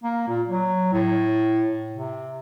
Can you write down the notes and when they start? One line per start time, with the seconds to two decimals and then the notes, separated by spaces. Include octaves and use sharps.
0.04 A#3
0.28 A#2
0.47 F#3
0.93 A2
1.92 C3